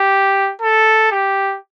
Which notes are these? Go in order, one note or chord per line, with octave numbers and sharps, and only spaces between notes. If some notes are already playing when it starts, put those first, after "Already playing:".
Already playing: G4
A4
G4